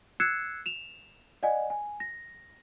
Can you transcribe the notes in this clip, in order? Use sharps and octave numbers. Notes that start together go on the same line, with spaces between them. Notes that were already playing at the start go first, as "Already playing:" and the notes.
E6 F#6 G#6 C7 C#7 E7
E7 F7
D5 D#5 F#5 G#5
G#5
A#6